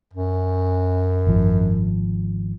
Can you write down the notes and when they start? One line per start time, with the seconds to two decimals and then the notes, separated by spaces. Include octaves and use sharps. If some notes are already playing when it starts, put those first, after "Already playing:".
0.13 F#2
1.27 G#1 F3